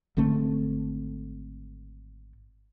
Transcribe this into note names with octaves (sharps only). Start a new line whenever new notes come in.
G#1 D3 A3 C4